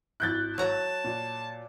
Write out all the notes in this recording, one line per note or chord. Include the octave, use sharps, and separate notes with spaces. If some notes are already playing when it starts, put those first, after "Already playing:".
G#1 E4 F#6 G6 A6
F#3 A5 A#5
A#2